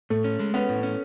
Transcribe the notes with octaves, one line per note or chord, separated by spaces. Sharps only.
A2 A3
C#4
G#3
B3 C#4
A2
C#4